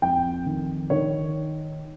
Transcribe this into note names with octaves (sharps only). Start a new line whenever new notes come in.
F2 G5
D#3
D#3 C#5